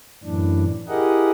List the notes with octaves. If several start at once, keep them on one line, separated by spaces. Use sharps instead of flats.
F#2 A2 E3 D4
E4 G4 G#4 A#4 D#5 F#5